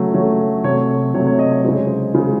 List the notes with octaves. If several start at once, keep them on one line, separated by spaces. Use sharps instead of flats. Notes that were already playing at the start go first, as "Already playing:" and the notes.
Already playing: C#3 F#3 A3
C#3 F#3 A3 C#5
C3 F#3 A3 C#5
C3 F#3 A3 C#5
C#5
D#5
C#5
C#3 G#3 C5
C#3 G#3